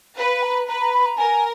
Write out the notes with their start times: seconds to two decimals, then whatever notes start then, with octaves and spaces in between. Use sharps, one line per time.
0.18 B4 F5
0.42 A#5
0.68 B4 A#5
0.80 A#5
0.93 B5
1.05 A#5
1.17 A#4 G#5